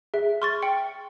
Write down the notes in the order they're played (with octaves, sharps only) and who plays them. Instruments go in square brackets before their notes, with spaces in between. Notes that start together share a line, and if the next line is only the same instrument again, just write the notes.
[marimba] G#4 [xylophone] E5
[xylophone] C6 C#6 A6 [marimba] F6
[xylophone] G5 C#7